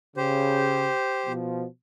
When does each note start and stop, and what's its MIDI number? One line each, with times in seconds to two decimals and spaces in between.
0.17 0.89 49
0.17 1.32 67
0.17 1.32 72
1.26 1.65 47
1.26 1.65 53